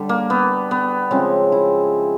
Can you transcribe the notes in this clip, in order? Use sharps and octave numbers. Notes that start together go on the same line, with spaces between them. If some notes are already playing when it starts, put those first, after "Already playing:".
Already playing: D3 G3
A#3
B3
B3
C#3 F3 G#3 C4
E4